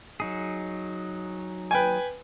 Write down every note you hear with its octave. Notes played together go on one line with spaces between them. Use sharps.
F#3 D#4 G#4
B4 G5 G#5